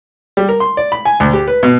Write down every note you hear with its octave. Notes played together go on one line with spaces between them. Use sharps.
G3
A#4
C6
D5
B5
G#5
D2
G4
B4
B2